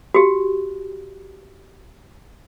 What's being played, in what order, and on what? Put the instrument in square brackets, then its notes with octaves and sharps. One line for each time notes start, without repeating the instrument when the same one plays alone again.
[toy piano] F#4 G4